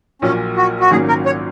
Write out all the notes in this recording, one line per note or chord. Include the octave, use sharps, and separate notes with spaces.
A#1 A#2 F#3 C#4
F#4
F#4
G#1 G#2 F#3 A#3 C#4 G#4
A#4
C#5